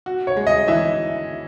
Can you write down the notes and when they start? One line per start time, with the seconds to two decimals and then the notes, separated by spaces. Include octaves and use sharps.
0.06 F#4
0.27 C#5
0.37 G#3
0.47 D#5
0.68 E3 E5